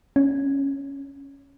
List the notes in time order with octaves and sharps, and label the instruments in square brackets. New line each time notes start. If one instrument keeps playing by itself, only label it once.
[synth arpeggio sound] C#4